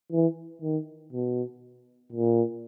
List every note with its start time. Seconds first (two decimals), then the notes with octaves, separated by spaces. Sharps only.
0.12 E3
0.62 D#3
1.13 B2
2.12 A#2